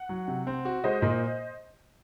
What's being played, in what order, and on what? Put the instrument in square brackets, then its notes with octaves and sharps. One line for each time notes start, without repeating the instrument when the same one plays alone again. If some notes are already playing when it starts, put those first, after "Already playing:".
Already playing: [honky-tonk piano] F#5
[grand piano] F#3
C3
C4
F#4
[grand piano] G#3 [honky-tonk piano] C5 D#5
[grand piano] A#2